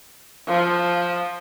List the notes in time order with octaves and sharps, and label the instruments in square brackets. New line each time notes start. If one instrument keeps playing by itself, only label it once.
[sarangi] F3